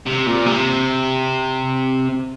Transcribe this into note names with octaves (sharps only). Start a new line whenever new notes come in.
C3
A#2
C3